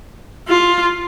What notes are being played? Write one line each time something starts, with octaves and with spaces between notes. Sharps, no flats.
F4